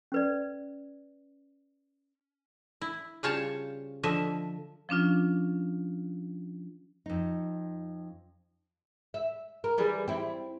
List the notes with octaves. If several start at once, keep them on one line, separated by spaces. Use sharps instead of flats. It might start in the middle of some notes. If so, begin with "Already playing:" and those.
C#4 B4 D5
E4
C#3 G3 F4 C5 C#5 A5
D3 F3 D#5 E5
F3 C#4 D4 F4
F2 D#4
E5
A#4
E3 G3 G#4
C4 E4